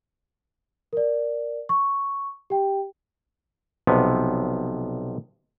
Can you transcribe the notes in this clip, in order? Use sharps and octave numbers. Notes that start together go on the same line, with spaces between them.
A#4 D5
C#6
G4 G5
B1 C3 F3 B3